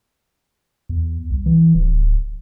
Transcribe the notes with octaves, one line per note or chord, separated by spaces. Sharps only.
E2
C2
E3
D1